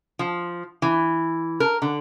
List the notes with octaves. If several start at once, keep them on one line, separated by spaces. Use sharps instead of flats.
F3
E3
A#4
D3